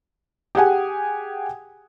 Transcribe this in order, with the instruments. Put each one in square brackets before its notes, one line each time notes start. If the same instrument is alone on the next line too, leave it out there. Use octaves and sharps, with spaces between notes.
[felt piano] G4 G#4 F#5 G#5